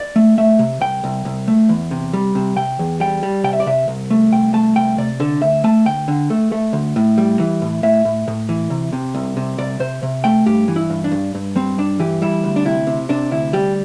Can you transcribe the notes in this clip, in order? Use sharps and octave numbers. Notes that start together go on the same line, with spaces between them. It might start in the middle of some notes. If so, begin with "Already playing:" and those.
Already playing: D5
A3
A3 E5
C3
C2 G5
C2
C2
A3
E2
C3
G3
C3
C3 G5
E2
G3 G5
G3
C3 G5
E5
D5
C3 E5
C2
A3
C2 G5
A3 A5
C2 G5
C3 D5
D3 A4
D2 E5
A3 A5
D2 G5
D3
A3
A3
D2
A2
G3
E3
A2
A2 E5
A2
A2
E3
C3
C3
C2
C3
C2 D5
C3 C5
C3
A3 G5
G2 G4
E3
E4
G2
D4
G2
G2
G3 C4
G2 D4
E3 G4
G3 E4
D2
D4
C3 E4
C3
C3 D4
D2 E4
G3 G4